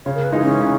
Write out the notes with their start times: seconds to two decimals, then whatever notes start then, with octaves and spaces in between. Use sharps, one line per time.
0.05 C#3 C#5
0.15 A#4
0.24 B4
0.32 E3 G#3 D#4
0.42 C#4
0.60 C#3